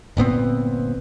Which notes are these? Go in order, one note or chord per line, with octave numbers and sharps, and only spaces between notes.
G1 A#2 B3 C4